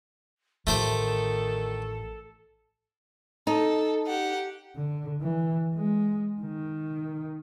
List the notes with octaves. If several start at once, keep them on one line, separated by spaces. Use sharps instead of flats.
A1 D#3 A3 F4 A4 C5 D6
D#4 A4
G4 F#5
D3
E3
G#3
D#3